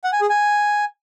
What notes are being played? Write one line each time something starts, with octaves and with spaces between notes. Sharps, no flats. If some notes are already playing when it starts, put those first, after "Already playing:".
F#5
G#5
G#4
G#5